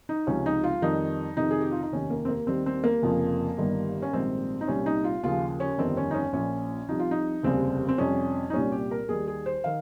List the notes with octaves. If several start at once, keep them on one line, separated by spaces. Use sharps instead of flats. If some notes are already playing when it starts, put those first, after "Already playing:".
D#4
C#2 C3 F3 C#4
D#4
F4
F2 D#3 G3 D#4
F2 C3 D#3 D#4
G#4
G4
F4
D#4
F1 D#2 D#3 C#4
A#3
C4
A#3
D#2 D#3 G3 C4
C4
A#3
F1 F2 C#3 F3
G1 G2 D#3 G3
C#4
A#1 G#2 D#3 G3 C4
D#4
C2 A#2 G3 C#4
D#4
F4
D#2 C#3 F3 F4
C#4
G1 F2 D#3 G3 C4
C#4
D#4
C#4
A#1 A#2 F3 C#4
C2 C3 F3 D#4
F4
D#4
F1 D#2 C#3 G3 C4
C4
F2 C3 G3 C#4
D#4
C2 A#2 G3 C#4
G4
A#4
D#2 D#3 G3 G#4
G#4
C5
D#3 F5